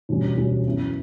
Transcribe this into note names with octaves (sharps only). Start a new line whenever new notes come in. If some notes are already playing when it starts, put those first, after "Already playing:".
E1 D2 D3 G3 C#4
E1 D2 D3 G3 C#4
F#2 E3 B3